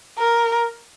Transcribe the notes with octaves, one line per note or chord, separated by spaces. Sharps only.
A#4